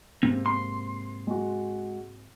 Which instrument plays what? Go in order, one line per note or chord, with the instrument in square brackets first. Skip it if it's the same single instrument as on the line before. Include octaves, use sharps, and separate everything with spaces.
[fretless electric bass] G#2 C3 A#3 [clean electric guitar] C4
[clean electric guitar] C6
[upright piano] G#3 F#4